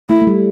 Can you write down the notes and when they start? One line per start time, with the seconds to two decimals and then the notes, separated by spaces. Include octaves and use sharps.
0.09 A3 E4
0.22 A3
0.27 G3